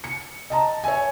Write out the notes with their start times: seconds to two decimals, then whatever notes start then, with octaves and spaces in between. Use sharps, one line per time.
0.04 C#7
0.50 D#5 A5 A#5
0.84 C#5 E5 G#5